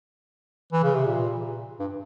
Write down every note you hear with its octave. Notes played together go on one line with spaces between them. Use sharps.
E3
C#3
C3
A#2
G2